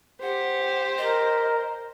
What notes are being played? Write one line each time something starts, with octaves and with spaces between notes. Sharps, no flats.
G4 C5 F#5
A#4 D#5